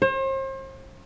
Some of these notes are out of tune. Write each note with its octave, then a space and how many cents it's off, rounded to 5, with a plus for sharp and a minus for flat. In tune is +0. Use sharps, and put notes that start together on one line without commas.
C5 +40